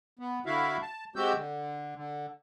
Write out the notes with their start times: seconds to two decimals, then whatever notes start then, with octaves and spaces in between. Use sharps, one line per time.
0.19 B3
0.46 D3 E4 F#4 E5 F5
0.82 A5
1.16 G#3 C4 F#4 G4 E6 G6
1.36 D3
1.96 D3